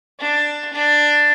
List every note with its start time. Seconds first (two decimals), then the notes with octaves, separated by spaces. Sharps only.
0.20 D4
0.73 D4